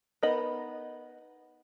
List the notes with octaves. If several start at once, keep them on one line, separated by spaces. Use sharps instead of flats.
B3 D#4 A#4 D#5 B5